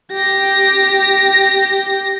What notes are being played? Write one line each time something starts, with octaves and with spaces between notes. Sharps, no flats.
G4 A#6